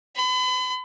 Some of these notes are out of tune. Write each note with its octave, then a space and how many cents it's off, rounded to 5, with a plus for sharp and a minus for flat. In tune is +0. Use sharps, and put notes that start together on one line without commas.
B5 +40